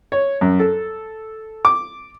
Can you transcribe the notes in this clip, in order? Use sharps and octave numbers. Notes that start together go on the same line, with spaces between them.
C#5
F#2
A4
D6